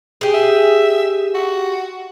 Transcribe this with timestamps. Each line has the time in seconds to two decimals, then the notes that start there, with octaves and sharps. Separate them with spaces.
0.21 G4 G#4
0.34 E5
1.34 F#4